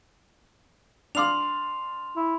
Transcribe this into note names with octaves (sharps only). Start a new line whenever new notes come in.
D4 F5 C6 D6 F7
E4